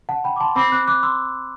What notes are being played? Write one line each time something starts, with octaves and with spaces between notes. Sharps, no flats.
F#5 A5
G5 B5
D6
A5 C6
C4 B5 D6
D6 F#6
D6 F#6
C6 E6